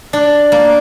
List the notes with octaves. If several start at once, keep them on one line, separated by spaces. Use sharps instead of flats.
D4
A#3